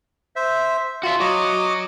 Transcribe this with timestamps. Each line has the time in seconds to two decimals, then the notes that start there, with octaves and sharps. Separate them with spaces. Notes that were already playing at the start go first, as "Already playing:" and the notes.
0.36 C5 E5
1.03 F4 F#4 E5
1.20 F#4 C#5 D#5 D6